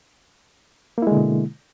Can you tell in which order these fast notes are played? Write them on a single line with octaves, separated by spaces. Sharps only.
A#3 E4 G#3 D3 B2